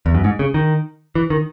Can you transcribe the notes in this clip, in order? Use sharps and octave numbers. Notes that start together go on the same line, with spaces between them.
E2
F#2
G#2
C#3
D#3
E3
D#3